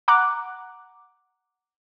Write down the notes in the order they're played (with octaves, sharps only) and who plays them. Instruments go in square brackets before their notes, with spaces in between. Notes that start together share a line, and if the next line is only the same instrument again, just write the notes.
[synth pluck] F#5 A#5 D6 F#6